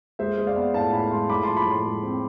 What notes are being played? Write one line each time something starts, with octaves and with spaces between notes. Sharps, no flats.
G#3 C5 E5
G#3
D5 F5
B3
A2 F5 A5
A2 G#5 B5
G#3 A5 C6
A2 B5 D6
F3 A5 C6
B5 D6
A2 A5 C6
G#3
C4